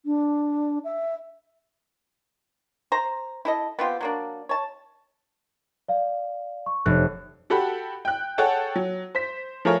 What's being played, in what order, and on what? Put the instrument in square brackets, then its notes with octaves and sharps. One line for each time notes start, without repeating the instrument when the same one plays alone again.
[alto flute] D4
E5
[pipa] C5 A#5
E4 A4 D#5
B3 C4 F4 G4
F#3 A#3 D4
C#5 A5
[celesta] D5 F5
C#6
[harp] F1 [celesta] C#5 F#6
[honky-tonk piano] F#4 G4 A4 F#5 B5
G5 F#6
G#4 A4 C#5 F#5 G5 A5
F#3
C5 B6
F3 A3 F4 G#4 A#4 C#5